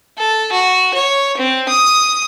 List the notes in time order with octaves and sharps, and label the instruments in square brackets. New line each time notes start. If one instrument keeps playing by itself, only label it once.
[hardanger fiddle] A4
F#4
C#5
C4
D#6